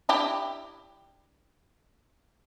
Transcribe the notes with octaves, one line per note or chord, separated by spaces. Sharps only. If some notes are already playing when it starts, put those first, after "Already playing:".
D4 E4 G4